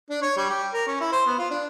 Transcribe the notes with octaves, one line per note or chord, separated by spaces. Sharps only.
D4
C#5
G3
G4
A#4
C#4
E4
C5
B3
F4
D4